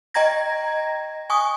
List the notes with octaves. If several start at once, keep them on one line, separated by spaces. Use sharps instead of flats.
D#5 G5 A#5 G#6 A#6
G#5 C#6 D#6